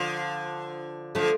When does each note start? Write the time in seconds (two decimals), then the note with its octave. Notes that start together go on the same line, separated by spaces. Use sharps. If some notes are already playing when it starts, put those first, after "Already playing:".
Already playing: D3 F3
1.15 D3 F3 A3